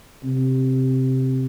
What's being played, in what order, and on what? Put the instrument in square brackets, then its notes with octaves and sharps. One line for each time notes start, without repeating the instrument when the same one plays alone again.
[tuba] C3